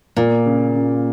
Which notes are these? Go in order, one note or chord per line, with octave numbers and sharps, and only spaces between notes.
A#2 A#3
C#3
C#3